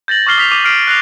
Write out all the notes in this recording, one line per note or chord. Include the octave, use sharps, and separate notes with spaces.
G6 A6 A#6 F#7
C#6 D6 F6 C7 G7
D#6 B6 F7
D6 D#7 F7
F6 B6 C7 D7
F#6 A#6 C7 F7